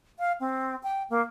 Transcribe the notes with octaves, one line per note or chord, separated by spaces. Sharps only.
F5
C4
G5
A#3